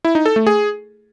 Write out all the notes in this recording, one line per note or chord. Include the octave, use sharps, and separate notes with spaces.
E4
D#4
A4
A3
G#4